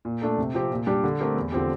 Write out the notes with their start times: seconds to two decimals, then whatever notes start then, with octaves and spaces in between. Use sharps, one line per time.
0.05 A#2
0.21 A3 D4 A4
0.38 C3
0.54 F3 C4 G4
0.71 A#2
0.87 G3 D4 G4
1.04 D3
1.20 A3 C4 G4 A#4
1.36 E2
1.52 D3 F3 C4 G4